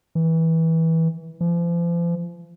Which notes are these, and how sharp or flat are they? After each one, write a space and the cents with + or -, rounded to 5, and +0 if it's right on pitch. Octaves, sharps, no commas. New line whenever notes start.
E3 -20
F3 -40